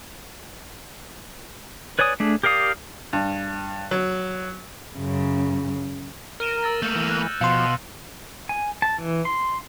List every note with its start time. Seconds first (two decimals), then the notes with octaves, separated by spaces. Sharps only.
1.99 B4 C#5 D5 G#5 D#6
2.20 A3 D4 G#4
2.43 G4 A#4 D5 F5 D#6
3.13 G2
3.91 F#3
4.96 F#2 C#3
6.40 A#4 F6 D#7 E7
6.63 E6 A6 A#6
6.82 A3 A#3 G6 C#7
6.95 E3
7.09 F#6
7.41 B2 F3 F5 C6 C#7
8.49 G#5
8.82 A5
8.98 E3
9.25 C6